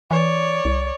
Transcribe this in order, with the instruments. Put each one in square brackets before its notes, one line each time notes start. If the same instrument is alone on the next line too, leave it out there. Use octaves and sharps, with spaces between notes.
[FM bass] E3 [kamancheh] C#5 D5
[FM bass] C2